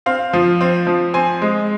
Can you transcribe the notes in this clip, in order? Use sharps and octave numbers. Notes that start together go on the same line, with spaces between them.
C4 F5
F3
C4
F3
C4 G#5
G#3